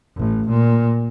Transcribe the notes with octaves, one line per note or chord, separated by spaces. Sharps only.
A1
A#2